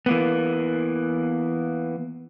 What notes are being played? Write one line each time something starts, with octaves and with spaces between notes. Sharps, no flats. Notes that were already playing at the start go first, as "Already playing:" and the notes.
E3 A#3 B3